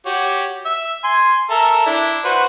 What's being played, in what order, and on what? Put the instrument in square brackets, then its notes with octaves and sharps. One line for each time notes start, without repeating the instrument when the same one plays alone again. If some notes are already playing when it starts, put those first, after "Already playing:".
[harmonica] F#4 G4 C#5
E5
G#5 C6
A4 A#4 E5
D4 E4
F#4 B4 C5